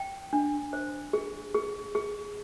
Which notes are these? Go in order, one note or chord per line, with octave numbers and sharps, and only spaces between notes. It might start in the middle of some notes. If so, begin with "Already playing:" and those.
Already playing: G5
D4
C5
G#4
G#4
G#4